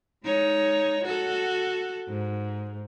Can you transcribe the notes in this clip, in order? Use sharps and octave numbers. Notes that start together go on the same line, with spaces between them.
G#3 D#4 C#5
F#4 A4
G#2